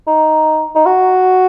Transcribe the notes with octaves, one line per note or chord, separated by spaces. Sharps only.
D#4
D#4
F#4